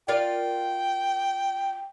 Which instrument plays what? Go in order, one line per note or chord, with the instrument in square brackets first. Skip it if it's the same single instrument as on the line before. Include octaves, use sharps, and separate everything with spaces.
[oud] F4 A#4 D5 [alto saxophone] G5